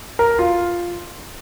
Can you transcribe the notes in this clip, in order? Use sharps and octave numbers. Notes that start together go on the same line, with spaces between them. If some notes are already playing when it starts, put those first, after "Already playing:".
A#4
F4